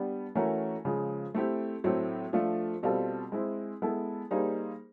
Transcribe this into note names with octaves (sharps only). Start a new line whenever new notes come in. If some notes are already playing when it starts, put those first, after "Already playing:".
Already playing: G3 B3 D4 G4
E3 A3 C#4 F#4 A#4
C#3 F3 G#3
A3 C4 E4 G4
A2 F#3 A3 C4 E4
F3 A3 D4 F4
B2 G3 C4 F4 A4
G#3 C4 E4
G#3 B3 E4 A4
G3 A#3 D#4 G#4 C5